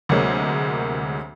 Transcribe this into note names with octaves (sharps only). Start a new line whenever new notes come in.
D2 C3 F#3 G#3 A#3